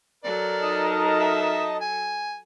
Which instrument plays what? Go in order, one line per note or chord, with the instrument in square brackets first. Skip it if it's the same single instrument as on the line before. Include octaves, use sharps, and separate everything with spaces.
[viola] F#3 A4 [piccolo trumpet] A#4 [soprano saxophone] D5
[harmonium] D#4 D#5 A5
[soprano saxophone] E5
G#5